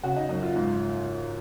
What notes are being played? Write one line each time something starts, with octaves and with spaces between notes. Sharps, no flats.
C#3 F#4
D#4
F#2 D#4
F4
G#2